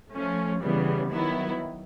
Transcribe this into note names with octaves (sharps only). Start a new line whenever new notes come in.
F3 A3 C#4
C#3 E3 G3 B3
D#3 F#3 B3 E4